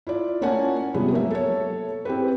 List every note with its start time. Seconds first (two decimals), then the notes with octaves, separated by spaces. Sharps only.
0.07 E4 F4 D5
0.41 A#3 C#4 F4 F#5 G#5 A5
0.94 C3 F3 G3 G#3 B3
1.11 F#3 A#3 A#4 E5
1.31 A4 C#5
2.05 C4 E4 G4 G#4 B4